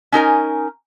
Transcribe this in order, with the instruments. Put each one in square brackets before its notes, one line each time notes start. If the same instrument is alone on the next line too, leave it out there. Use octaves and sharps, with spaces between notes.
[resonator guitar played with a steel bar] C#4 D#4 A#4 G#5